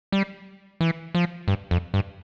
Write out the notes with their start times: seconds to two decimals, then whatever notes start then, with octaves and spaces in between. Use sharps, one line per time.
0.12 G3
0.81 E3
1.15 F3
1.48 G2
1.71 F2
1.94 G2